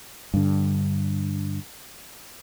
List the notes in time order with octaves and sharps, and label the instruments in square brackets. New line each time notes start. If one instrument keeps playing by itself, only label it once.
[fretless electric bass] G2 D3